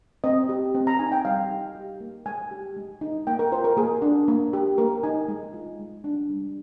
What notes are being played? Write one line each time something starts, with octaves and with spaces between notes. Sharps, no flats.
C4 D#5
G4
C4
A#5
D#4 G#5
G5
G3 F5
D#4
G4
A#3
G#3 G#5
G4
G#3
D#4
A#3 G5
A#4
F4 C5
A#4
A#3 G#4
D4
A#3
G4
A#3 A#4
D#4 G#5
G#3
F4
G#3
D4
G3